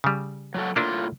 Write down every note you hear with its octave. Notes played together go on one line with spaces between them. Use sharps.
C#3 G3
F#3 F#4 A4
A2 A#3 D4 E4 F4